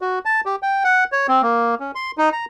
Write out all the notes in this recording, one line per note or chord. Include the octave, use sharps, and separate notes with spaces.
F#4
A5
G4
G5
F#5
C#5
C4
A#3
C#4
C6
D#4
A#5